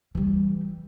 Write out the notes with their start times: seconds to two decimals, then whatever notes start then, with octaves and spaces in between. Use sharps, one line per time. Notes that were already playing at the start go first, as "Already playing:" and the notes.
0.15 E3 G3